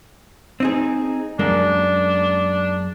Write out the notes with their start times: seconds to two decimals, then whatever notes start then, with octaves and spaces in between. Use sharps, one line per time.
0.60 C4 D#4 G#4
1.39 F#2 G#3 A#3 D4